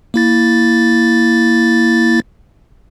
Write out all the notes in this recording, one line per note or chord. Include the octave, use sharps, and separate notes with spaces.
A#3 E4 A6